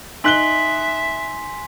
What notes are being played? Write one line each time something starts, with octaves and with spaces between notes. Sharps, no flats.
D#4 E5 G#5 C6 F#6 B6 G7